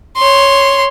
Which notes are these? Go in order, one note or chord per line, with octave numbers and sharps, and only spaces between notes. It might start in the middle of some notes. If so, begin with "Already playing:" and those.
C#5 C6